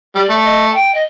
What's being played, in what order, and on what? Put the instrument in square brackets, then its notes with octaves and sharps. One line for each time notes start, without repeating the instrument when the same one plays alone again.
[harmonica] G3 [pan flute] D5
[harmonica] A3
[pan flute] D#5
A5
G5
D#5